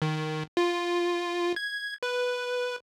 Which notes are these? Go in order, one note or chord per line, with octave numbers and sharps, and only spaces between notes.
D#3
F4
G#6
B4